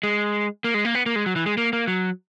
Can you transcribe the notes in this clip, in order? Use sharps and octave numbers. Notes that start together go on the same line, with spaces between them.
G#3
A#3
G#3
A#3
B3
A#3
G#3
F#3
E3
G#3
A#3
A#3
F#3